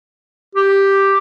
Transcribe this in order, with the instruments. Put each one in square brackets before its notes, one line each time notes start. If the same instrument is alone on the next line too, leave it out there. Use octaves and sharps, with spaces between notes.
[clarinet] G4